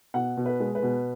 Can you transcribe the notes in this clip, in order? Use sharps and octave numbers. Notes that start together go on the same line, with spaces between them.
B2 F#5
B2
B4
G#3
B4
B2